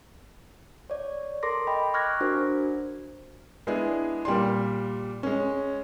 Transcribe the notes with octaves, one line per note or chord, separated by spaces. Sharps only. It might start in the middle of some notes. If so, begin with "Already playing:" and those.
C#5 D5
A4 A#4 C6 D6 A#6
D#5 G5 B5
C#6 D6 F6 F#6 G#6 A#6
D4 F#4 A#4 C5
G#3 B3 D4 E4 G#4
A#2 G3 D5 C6
G#3 C#4